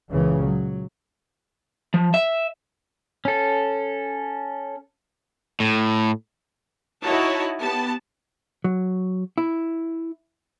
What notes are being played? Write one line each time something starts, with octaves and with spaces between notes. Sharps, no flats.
C#2 A#2 C#3 E3
F#3
F3
E5
C#4 A4
A2
D#4 E4 F#4 C#5 A5
B3 G4 A5
F#3
E4